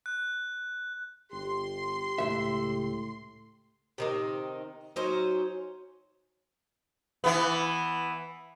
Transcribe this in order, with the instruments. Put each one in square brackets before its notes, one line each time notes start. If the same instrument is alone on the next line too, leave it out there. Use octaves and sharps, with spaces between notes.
[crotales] F#6
[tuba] G1 [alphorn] G4 [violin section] C6
[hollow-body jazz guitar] C#2 C#3 E5 [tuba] A2
[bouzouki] C3 D#3 D#4
F#3 C#4 D#4 C5
[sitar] E3 B3